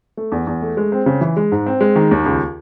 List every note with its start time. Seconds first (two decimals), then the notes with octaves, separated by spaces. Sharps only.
0.17 A3
0.32 E2
0.47 E2
0.62 A3
0.77 G#3
0.92 C4
1.06 C#3
1.21 E3
1.37 G#3
1.52 G#2
1.66 C4
1.81 G#3
1.96 D#3
2.11 D#2
2.26 C#2